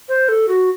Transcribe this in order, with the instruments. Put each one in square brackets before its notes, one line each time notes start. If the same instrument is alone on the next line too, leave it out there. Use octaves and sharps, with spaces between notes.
[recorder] C5
A4
F#4